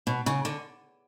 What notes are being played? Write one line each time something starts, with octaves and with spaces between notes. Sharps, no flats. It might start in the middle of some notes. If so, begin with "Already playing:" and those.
B2
C#3
D3